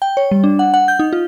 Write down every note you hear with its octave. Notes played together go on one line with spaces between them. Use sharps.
G5
C#5
G3
D4
F#5
F#5
G6
D#4
F4